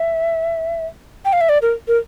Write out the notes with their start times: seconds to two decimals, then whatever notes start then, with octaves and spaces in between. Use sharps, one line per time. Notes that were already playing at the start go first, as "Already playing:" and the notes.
Already playing: E5
1.25 G5
1.33 F5
1.41 E5
1.49 D5
1.62 A#4
1.88 A#4